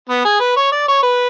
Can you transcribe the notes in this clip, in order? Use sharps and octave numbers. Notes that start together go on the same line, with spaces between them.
B3
G#4
B4
C#5
D5
C#5
B4